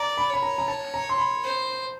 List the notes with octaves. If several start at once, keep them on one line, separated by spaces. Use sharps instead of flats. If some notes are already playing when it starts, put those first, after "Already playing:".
Already playing: D5 A#5
B5
C#5 B5
A#5
A#5
A5
A#5
C6
B5
C5